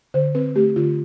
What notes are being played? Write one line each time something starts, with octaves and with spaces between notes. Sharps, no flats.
D3 C5
C4 B4
A3 G4
D3 F4